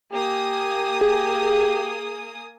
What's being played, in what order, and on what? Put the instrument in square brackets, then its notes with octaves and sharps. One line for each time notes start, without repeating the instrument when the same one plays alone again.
[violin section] A#3 G#5 D#6 [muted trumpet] G4
[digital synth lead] G#4